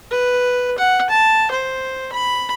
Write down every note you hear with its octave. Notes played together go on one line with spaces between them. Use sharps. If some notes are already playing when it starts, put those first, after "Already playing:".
B4
F#5
A5
C5
B5